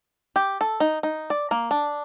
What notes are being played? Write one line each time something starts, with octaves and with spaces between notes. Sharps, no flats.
G4
A4
D#4
D#4
D5
A#3
D4